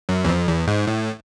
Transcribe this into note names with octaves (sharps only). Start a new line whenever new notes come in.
F#2
E2
F2
E2
G#2
A2